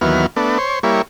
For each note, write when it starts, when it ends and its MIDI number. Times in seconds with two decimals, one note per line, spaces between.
0.01 0.26 39
0.01 0.26 52
0.01 0.26 54
0.01 0.26 59
0.01 0.26 89
0.36 0.58 57
0.36 0.58 59
0.36 0.58 62
0.58 0.79 72
0.58 0.79 73
0.83 1.02 55
0.83 1.02 58
0.83 1.02 64
0.83 1.02 73